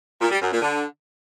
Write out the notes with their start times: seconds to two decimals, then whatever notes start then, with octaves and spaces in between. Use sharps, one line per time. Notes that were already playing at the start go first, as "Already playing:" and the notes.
0.21 A#2
0.31 G3
0.41 F#2
0.51 A#2
0.61 D3